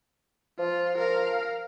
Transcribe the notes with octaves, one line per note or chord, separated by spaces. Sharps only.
F3 F4
A#4 F5